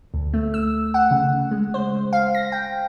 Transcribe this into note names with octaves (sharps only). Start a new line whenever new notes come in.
D2
A3
E6
F#5
C#3
G#3
C5
F5
A#6
G5